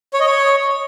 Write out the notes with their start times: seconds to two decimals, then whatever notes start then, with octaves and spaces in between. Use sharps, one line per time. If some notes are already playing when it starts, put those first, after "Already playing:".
0.14 C#5
0.20 D#5
0.26 C#5